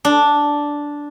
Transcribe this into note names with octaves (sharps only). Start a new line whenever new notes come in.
D4